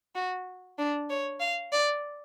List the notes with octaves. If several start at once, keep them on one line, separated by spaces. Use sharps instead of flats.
F#4
D4
C#5
F5
D5